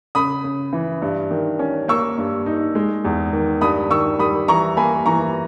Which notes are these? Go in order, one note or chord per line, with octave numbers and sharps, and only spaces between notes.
C#3 B5 D#6
C#3
E3
G2
D#3
C#4
A#3 C#6 E6
G2
D#4
G#3
E2
D#3
G2 B5 D#6
D#3 C#6 E6
G3 B5 D#6
E3 A#5 C#6
A#3 G#5 B5
E3 A#5 C#6